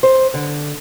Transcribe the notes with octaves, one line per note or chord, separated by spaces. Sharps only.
C5
D3